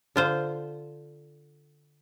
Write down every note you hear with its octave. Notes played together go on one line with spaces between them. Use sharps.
D3 F4 C5